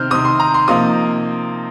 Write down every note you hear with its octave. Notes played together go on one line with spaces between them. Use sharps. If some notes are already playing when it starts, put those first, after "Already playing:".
Already playing: C3 D#3 C4 F6 G6
C3 D#3 C4 D#6
C6
A#5
C6
C3 F3 A#3 D#4 D#6